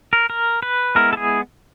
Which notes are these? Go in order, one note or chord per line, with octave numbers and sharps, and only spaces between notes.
A#4
A#4
B4
G#3 B3 E4 A#4
A4
G#4